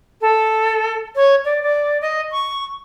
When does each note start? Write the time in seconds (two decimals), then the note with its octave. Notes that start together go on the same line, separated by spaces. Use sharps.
0.21 A4
1.16 C#5
1.45 D5
1.62 D5
2.01 D#5
2.32 C#6